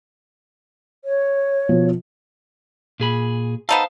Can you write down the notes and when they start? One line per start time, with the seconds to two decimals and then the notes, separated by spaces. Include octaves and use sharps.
1.04 C#5
1.69 B2 F3
3.00 A#2 G#4 B5
3.69 B3 D#4 A4 C5 F5